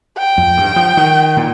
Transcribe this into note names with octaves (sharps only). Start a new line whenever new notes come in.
G5
F2
G2
F3
D#3
A#2